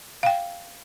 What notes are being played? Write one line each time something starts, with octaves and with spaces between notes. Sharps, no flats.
F5 G5